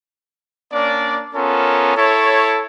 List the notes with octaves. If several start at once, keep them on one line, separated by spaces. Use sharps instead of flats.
A#3 C#4 D4 D5
B3 C#4 F4 A4 A#4
E4 A4 C#5